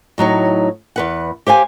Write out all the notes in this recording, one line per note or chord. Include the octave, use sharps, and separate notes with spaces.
A2 F#3 D#4 C#5
E2 B4 F#5
G4 C5 F5 G#5